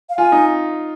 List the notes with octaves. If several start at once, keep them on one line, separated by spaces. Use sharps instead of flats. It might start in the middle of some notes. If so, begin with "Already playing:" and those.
F5
F4 G#5
D#4